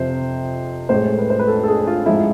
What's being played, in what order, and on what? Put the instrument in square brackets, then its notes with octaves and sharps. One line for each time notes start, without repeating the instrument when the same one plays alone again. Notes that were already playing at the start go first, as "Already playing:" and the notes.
Already playing: [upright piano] F2 C3 F3 C5
A2 G#3 C5
B4
C5
B4
A4
A4
G#4
F4
G#2 F3 G#3 E4